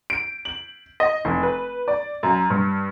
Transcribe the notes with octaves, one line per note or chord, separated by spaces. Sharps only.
D7
F#7
D#5
F1
B4
D5
F#2
G2